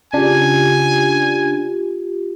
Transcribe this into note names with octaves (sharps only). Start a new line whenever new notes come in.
C#3 D4 F4 G4 G#5